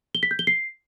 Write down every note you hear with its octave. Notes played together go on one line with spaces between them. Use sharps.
G7
B6
G6
G7
C7